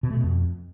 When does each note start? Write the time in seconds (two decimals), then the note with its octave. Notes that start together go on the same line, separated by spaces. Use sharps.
0.03 B2
0.10 A3
0.17 B2
0.23 F2